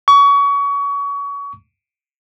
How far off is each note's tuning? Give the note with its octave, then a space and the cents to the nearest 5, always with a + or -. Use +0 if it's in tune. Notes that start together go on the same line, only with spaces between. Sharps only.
C#6 +30